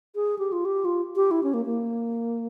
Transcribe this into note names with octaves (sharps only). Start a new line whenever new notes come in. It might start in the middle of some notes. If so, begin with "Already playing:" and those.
G#4
G4
F4
G4
F4
G4
E4
C#4
A#3
A#3